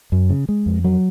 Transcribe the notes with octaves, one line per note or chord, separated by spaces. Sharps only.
F#2
C#3
G#3
F2
F#3